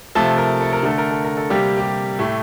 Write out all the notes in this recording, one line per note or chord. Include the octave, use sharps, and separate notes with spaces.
C3 F3 A3 A5
A#4
A4
A#4
D3 A3 A4
A#4
A4
A#4
A4
C3 G3 A#3 G4
G4
A2 A3